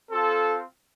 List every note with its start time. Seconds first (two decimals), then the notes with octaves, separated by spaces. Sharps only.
0.11 C4 F4 A4